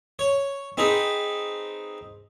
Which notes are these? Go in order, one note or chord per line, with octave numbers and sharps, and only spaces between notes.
C#5
C4 D#4 G#4 B4